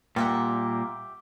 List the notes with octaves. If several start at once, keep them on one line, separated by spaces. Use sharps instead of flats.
A#2 G3 A#3 G4 E5 F#5